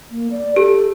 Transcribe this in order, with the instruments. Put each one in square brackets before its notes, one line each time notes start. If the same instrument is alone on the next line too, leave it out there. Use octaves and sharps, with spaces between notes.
[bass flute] A#3
D5
[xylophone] G4 [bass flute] A4